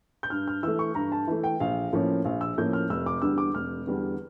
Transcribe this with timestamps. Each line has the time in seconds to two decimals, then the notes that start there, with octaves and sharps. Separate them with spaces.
0.23 G6
0.30 G2 F6
0.48 F6
0.63 E3 A3 E6
0.79 C#6
0.95 G2 A#5
1.12 A5
1.27 E3 A3
1.44 G5
1.60 A#1 F5
1.93 A2 F3 A#3 C#4
2.24 A#1 F5
2.41 E6
2.58 A2 F3 A#3 C#4 G6
2.73 F6
2.89 F1 E6
3.06 D6
3.22 E2 D3 G3 D4 E6
3.38 D6
3.55 F1 F6
3.87 E2 D3 G3 D4